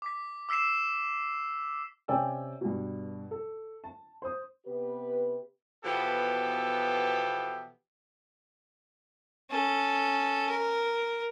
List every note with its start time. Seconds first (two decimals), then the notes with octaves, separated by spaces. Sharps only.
0.02 D6 B6
0.49 D6 E6 B6 C7 E7
2.08 C3 C#4 D5 G5 G#5 E6
2.61 G2 B2
3.31 A4
3.84 A5
4.22 C5 D#6
4.66 C3 B3 G4 B4
5.84 B2 E3 F3 B3 G4 A4
9.50 C#4 A4
10.49 A#4